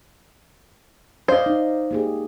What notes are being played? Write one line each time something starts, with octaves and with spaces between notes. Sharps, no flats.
C5 D5 D#5 F5
D#4
A#3 G4 G#4